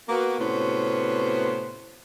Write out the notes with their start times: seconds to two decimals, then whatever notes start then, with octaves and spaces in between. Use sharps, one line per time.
0.09 A#3 B3 F#4
0.39 A2 C3 B3 C#4 F#4 C5